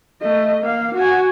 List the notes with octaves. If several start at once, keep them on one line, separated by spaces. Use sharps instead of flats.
A3 D#5
A#3 F5
F#4 G#5